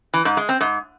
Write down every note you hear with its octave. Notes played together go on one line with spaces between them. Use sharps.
E3
G#2
G#3
C4
G#2